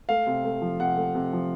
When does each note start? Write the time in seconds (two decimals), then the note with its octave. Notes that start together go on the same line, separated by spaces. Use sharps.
0.09 A3 F5
0.27 C3
0.44 A3
0.62 F3
0.79 C3 F#5
0.97 A3
1.15 C3
1.33 F3